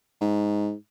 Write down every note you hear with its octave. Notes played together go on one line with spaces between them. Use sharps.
G#2